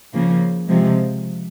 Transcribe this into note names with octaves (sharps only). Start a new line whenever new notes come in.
C#3 F3 A#3
C3 F3 G#3